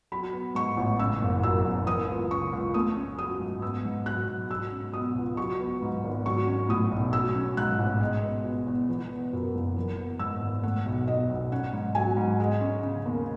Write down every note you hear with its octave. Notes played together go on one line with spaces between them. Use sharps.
F#3 B5
B3
G#2 C#6
A1
C#3 E6
F#1
F#2 E6
F#1
E3 D#6
C#2
C#3 C#6
C#2
A3 D#6
C#4
F#3 D#6
G#2
B3 E6
G#2
F#3 F#6
G#2
F#3 E6
C#4
B2 D#6
C#2
F#3 C#6
B3
G#2
G#1
F#3 C#6
C#4
A2 D#6
B1
F#3 E6
C#4
G#2 F#6
A1
G#3
B3
B2
E2
E3
B3
F#2
F#1
E3
B3
G#2 E6
G#1
A3 F#5
B1
B2 D#5
B1
C#4 F#5
G#2
F#3 G#5
G#2
G#3
C#4
C#3
D#2